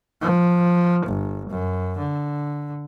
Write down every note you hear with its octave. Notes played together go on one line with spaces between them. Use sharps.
F3
G1
F#2
D3